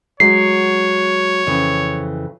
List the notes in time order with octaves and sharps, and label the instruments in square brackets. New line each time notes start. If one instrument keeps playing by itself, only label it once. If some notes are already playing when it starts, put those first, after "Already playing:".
[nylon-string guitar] F#3 G#3 [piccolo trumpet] C#5 [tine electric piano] C7
[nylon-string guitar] F2 C#3 E3